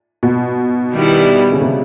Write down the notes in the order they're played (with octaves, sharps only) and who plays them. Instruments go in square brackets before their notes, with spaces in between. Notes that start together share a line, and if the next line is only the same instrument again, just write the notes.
[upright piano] B2
[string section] D#3 G3 B3 E4
[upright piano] C#3
C3